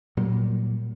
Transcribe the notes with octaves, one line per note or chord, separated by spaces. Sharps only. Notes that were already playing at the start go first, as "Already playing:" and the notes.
A#2 F#3 G3